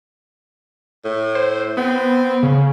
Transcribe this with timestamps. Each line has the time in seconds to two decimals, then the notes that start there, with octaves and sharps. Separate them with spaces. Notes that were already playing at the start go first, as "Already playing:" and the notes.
1.05 A2
1.35 C5
1.77 B3 C4
2.43 C#3